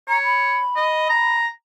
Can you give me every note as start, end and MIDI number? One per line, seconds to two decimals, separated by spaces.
0.08 0.59 73
0.08 0.22 82
0.24 1.37 83
0.76 1.05 75
1.09 1.48 82